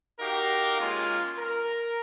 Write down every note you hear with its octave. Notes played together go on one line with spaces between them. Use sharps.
D#4 F#4 G4 A#4 F5
G#3 A#3 C#4 F4
A#4